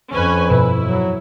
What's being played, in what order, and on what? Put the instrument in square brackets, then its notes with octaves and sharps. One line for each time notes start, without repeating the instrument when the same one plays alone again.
[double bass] F2 [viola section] C#4 B4 G#5
[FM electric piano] G2 B2 [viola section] E4 [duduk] B4
[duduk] F#3